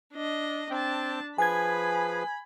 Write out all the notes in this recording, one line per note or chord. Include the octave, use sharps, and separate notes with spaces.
D4 D#5
C4 D4 G5 A5
F3 G#4 B4 G#5 B5 G#6